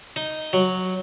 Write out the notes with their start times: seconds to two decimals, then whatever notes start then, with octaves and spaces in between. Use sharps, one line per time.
0.16 D#4
0.53 F#3